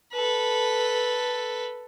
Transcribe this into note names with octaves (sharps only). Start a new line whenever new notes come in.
A4 B4